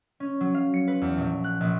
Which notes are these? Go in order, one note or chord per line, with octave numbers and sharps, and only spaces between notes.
C#4
F#3
F5
C#7
B4
E2
A#1
F#6
A#1